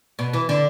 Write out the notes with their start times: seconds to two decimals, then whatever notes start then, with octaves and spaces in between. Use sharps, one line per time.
0.19 B2
0.33 E3
0.49 D3